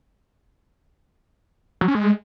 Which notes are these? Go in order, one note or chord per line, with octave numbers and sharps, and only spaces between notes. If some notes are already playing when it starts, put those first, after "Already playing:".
F#3
C#4
G#3